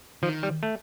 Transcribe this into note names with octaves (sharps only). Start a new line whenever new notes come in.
D#3 F3
G3
A3